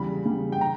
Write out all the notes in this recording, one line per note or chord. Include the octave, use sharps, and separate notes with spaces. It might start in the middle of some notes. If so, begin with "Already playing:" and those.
Already playing: E2 C#3 G3 B5
E2 C#3 G3
G5
A#5